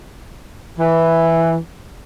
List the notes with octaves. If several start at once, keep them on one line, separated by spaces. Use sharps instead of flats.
E3